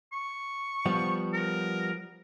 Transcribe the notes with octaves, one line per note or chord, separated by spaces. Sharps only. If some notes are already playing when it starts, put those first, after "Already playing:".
C#6
F3 G3 B3
A#4